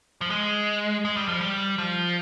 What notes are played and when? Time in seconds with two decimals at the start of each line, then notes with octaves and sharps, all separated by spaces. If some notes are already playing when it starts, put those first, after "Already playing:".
0.21 F3
0.30 G#3
1.05 G#3
1.17 G3
1.29 F3
1.41 G3
1.78 F3